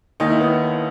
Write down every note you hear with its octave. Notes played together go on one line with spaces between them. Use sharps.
D#2 D#3 D#4
E4
B3 D#4